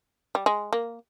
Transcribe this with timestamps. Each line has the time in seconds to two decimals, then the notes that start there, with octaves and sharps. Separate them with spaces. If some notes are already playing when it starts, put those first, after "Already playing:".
0.35 G3
0.46 G#3
0.73 A#3